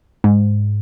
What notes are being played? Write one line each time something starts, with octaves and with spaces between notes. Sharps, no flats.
G#2